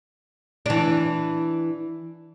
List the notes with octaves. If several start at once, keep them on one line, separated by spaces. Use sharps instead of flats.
E3 D4